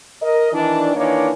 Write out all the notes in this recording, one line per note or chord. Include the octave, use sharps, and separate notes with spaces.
A#4 D#5
D#3 E3 D4
D#3 E3 A#3 D4 D#4 C#5